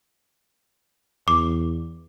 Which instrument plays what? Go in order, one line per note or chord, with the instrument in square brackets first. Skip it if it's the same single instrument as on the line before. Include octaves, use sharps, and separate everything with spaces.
[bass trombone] E2 [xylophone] D6